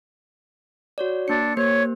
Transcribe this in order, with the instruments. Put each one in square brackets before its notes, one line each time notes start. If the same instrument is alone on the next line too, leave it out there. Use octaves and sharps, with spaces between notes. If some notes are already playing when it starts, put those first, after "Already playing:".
[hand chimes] F#4 C#5 D5
[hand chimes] A#3 C#7 [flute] D4
[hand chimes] A#3 G4 C5 [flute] C#5